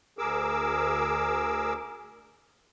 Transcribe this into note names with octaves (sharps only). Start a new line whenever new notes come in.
D2 G#4 A#4 D6 E6